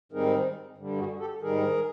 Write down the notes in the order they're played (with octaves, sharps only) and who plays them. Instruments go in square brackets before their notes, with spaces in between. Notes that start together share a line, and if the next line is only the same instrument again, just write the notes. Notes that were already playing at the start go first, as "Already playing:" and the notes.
[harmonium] G#2 D#3 G3 C4 D#4 G#4 A#4
G2 D3 G3
F#4 G#4
G4 A4
G#2 D#3 G3 G#4 A#4